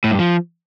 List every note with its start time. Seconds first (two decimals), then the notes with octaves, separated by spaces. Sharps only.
0.04 A2
0.12 G2
0.19 F3